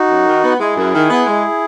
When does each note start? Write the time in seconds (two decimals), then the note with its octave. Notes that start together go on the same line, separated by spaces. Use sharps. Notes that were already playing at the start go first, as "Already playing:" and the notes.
Already playing: D#4 F#4
0.10 F#2
0.26 D#3
0.43 B3
0.60 G#3 E4 G#4
0.77 F#2
0.94 D#3
1.10 B3
1.26 G#3